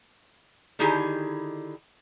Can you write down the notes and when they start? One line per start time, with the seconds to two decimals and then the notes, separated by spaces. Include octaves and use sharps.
0.79 D3 D#3 D#4 E4 G4 G#4